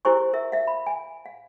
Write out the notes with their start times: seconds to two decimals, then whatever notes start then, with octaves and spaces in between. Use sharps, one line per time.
0.05 E4 G4 A#4 C5 G#5 C#6
0.33 A#4 E5
0.52 E5 F5
0.67 B5
0.87 G#5
1.26 F5